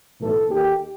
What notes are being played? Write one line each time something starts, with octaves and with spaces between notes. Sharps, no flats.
B1 A2 E3 A4
D#2 D#3 G4